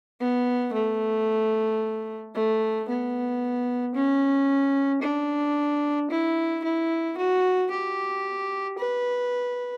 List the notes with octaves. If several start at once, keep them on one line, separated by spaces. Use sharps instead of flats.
B3
A3
A3
B3
C#4
D4
E4
E4
F#4
G4
B4